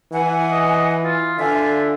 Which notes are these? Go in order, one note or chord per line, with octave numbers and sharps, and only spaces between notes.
E3 F#5 G#5
D#5
F4
D3 F4 E5 G#5